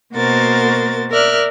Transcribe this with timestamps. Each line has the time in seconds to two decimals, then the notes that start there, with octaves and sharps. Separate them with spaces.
0.13 B2 A#3 F#4 A#4 C5 A6
1.10 A#4 D5 E5 F6 F#6